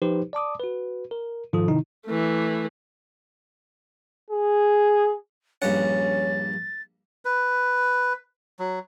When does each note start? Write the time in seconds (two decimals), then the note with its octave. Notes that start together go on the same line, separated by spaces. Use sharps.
0.02 F3 D#4 G4 B4 C5
0.33 D5 A5 D6 D#6
0.60 F#4 B4
1.11 A#4
1.53 G#2 D#3 F3 F4 A4 D#6
1.68 C3 D#3 D#4 E4
2.06 E3 A3
4.31 G#4
5.62 A#1 G2 C#4 F#5 A6
7.25 B4
8.59 F#3